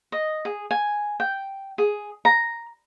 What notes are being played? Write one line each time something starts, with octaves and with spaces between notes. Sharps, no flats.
D#5
G#4
G#5
G5
G#4
A#5